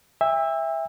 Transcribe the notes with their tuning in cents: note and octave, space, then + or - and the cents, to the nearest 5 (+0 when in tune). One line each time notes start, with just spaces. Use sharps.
E5 +0 G5 +45